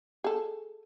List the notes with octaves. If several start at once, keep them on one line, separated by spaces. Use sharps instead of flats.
G#4 A4